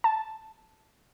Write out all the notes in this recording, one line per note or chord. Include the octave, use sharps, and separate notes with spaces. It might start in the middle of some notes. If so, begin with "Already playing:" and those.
A5